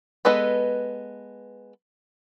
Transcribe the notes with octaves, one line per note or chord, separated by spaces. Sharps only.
G#3 B3 A4 B4 D#5